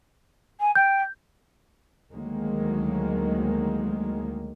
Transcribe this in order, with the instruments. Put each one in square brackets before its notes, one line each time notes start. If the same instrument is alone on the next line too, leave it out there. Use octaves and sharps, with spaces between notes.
[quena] G#5
[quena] G5 [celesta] G6
[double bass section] D2 D#3 F#3 G#3 A#3